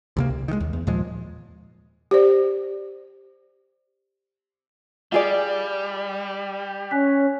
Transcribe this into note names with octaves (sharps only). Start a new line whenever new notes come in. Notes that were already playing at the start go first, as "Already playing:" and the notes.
D2 C3 A#3
C2
D#3 G#3
D#2
E2
D#2 A#2 F3 G#3
G4 C5 D5
G3 F4 G#4 D5 D#5
C#4 G#5 F#6 B6